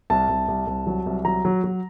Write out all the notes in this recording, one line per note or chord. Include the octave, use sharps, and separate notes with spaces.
C2 A5
C2
C2
C2
F#3
C2
F#3 A#5
F#3
F#3